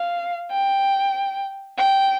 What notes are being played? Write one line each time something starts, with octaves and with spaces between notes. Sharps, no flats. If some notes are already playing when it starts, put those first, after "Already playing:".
Already playing: F5
G5
G5